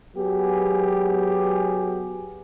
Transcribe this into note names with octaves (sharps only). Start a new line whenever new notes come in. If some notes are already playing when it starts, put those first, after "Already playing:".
F#3 B3 G4 G#4